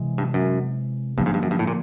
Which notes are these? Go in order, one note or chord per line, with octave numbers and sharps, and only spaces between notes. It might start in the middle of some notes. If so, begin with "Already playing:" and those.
Already playing: C3 E3 G#3
G2
F#2
G2 D3 F3 A#3
G#2
G2
F#2
G2
A2
A#2